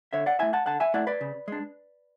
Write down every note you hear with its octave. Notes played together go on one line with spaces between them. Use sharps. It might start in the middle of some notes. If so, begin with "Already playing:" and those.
D3 C#5 E5
D5 F#5
A3 E4 E5 G#5
F#5 A5
D3 F#5 A5
E5 G#5
A3 E4 D5 F#5
B4 D5
C#3
G#3 D4